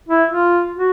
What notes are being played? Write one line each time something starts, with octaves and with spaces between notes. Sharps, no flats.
E4
F4
F#4